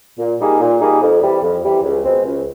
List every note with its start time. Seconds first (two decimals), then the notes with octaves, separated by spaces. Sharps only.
0.18 A#2
0.39 G3 A#3 D#4 G#4
0.60 A#2
0.81 G3 A#3 D#4 G#4
1.01 F2
1.21 C3 E3 G3
1.42 F2
1.63 C3 E3 G3
1.83 C#2
2.04 B2 G#3 C4
2.25 C#2